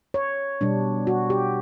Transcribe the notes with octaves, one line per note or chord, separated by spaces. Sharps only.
C#5
B2 G3 D4
F#4
G4